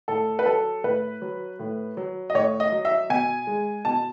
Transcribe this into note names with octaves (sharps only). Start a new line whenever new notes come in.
A2 A4
B4
F#3 A4
A2 B4
F#3
A2
F#3
D#5
A2 C#5
D#5
F#3
E5
B2 G#5
G#3
B2 A5